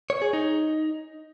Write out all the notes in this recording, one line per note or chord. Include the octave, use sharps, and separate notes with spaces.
C#5
G#4
D#4